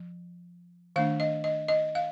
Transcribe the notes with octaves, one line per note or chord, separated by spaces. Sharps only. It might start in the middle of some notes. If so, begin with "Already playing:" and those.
Already playing: F3
D#3 A3 D4 F5
D#5
D#5
D#5
F5